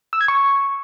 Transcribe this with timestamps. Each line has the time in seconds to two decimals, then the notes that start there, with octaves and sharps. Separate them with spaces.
0.13 E6
0.21 G#6
0.28 C#6